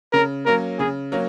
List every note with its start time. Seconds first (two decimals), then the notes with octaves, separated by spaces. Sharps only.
0.13 C#3 A#4
0.46 F#3 A#3 C#4 A#4
0.79 C#3 G#4
1.12 F#3 A#3 C#4